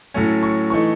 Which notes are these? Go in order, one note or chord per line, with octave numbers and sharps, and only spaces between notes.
A2 F#3 A3 C#4
C#6
E3 A3 D#4 C#6